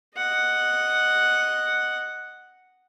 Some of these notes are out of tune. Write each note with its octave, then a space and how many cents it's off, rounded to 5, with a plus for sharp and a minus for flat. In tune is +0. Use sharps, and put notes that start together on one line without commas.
D#5 -5 F#5 +0